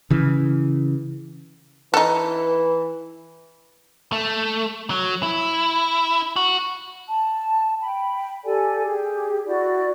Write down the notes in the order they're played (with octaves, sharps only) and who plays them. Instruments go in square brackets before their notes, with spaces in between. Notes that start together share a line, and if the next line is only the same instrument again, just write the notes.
[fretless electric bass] C#3 E3
[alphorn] E3 [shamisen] D#4 A4
[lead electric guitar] A3
F#3
E4
F#4
[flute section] A5
G5 B5
G4 A4 D5 G#5
G4 G#4
E4 F#4 D5